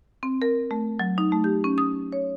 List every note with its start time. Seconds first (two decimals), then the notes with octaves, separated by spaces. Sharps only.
0.23 C4
0.42 A#4
0.71 A3
0.99 F#3
1.18 D#4
1.32 A3
1.44 G4
1.64 C#4
1.78 D#6
2.12 C#5